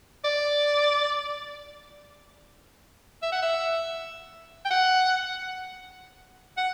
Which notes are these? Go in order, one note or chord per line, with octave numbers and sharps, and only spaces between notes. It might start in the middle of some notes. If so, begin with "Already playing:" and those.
D5
E5
F#5
E5
G5
F#5
F#5